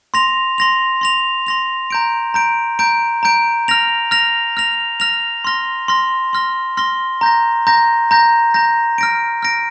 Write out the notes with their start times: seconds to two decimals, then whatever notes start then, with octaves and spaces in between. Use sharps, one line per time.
0.14 C6 A#6 F7
0.58 C6 A#6 F7
1.01 C6 A#6 F7
1.47 C6 A#6 F7
1.90 A#5 G6 D7
2.34 A#5 G6 D7
2.79 A#5 G6 D7
3.23 A#5 G6 D7
3.68 F6 A#6 F7
4.11 F6 A#6 F7
4.57 F6 A#6 F7
5.00 F6 A#6 F7
5.45 C6 F6 A#6 G7
5.88 C6 F6 A#6 G7
6.33 C6 F6 A#6 G7
6.77 C6 F6 A#6 G7
7.21 A#5 G6 A#6
7.67 A#5 G6 A#6
8.11 A#5 G6 A#6
8.54 A#5 G6 A#6
8.98 F6 A#6 D7
9.43 F6 A#6 D7